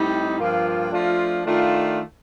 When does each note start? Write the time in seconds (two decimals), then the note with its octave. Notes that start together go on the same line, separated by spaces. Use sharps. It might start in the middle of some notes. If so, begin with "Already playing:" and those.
Already playing: A2 G3 C4 D#4
0.38 G2 F3 A#3 F4
0.91 F3 A3 D4 F4
1.45 D#3 A3 D4 F4